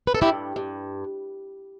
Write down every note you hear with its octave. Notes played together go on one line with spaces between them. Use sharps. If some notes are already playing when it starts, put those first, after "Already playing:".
B4
A4
G2 E4 G4
G2